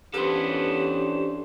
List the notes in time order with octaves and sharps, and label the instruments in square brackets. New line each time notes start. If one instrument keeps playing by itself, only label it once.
[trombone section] E3 C#4 D4 [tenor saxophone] B3 [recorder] G4 [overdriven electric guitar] A4 C5